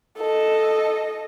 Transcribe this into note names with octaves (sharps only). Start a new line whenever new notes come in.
A4 D#5